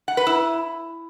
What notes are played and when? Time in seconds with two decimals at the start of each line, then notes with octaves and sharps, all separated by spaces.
0.08 F#5
0.17 B4
0.27 E4